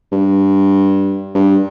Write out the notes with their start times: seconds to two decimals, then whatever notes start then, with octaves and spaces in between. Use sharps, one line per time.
0.12 G2
1.35 G2